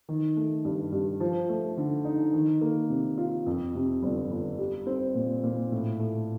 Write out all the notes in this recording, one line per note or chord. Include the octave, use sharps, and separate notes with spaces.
D#3
A3
G2
G2
F3
A3
D3
D#4
D#3
A#3
C3
F4
F2
C3
G1
G1
G3
C4
A#2
A#2
A2
A3